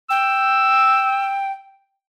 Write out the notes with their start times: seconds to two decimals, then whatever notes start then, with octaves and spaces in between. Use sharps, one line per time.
0.10 G5 E6